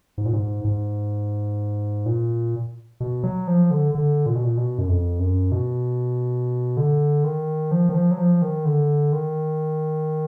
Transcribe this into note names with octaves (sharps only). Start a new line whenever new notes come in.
G#2
A#2
G#2
G#2
A#2
B2
F#3
F3
D3
D3
A#2
B2
A#2
B2
F#2
F2
F#2
B2
D3
D#3
F3
D#3
F3
F#3
F3
D#3
D3
D#3